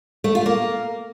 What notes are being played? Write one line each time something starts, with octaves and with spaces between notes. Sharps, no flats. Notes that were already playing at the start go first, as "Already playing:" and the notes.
A3
F4
A#3